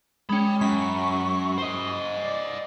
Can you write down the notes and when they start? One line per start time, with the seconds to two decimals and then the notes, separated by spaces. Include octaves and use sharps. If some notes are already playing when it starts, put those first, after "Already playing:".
0.29 G#3 C#4 G5 B5
0.61 F#2 B5 C#6
1.58 C5 D#5
2.22 D5